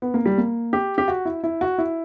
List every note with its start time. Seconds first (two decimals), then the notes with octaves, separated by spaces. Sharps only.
0.02 B3
0.14 A#3
0.26 G3
0.38 A#3
0.73 G4
0.98 G4
1.08 F#4
1.25 E4
1.44 E4
1.61 F#4
1.78 E4